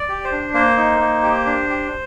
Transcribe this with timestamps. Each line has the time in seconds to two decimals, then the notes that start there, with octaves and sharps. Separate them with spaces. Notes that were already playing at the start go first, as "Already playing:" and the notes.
Already playing: D5
0.09 G4
0.24 C5
0.32 D4
0.54 A#3 C5
0.77 D#4
0.99 A#3
1.22 G4
1.46 D4
1.69 G4